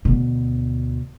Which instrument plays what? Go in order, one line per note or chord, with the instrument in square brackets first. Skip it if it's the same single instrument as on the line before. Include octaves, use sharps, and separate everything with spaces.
[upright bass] D2 B2